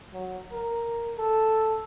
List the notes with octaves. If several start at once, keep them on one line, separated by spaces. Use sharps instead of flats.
F#3
A#4
A4